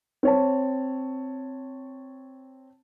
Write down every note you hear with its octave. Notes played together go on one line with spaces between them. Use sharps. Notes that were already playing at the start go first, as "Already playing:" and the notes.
C4 C#5 A5